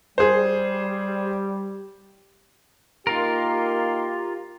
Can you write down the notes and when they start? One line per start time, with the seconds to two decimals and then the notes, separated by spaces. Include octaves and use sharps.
0.18 G3 G#4 C5
3.07 A#3 D#4 F4 G4 A#4 C6